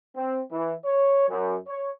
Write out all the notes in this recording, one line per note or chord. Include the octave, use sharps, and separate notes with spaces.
C4
E3
C#5
F#2
C#5